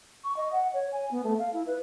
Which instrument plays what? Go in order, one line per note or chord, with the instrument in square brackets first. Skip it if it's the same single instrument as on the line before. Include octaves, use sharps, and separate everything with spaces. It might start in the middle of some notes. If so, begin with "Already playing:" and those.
[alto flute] C#6
D#5
F#5
C#5
G#5
B3
A3
F5
E4
B4